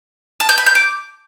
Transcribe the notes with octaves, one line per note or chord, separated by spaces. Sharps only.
A5
G6
B5
G6
D6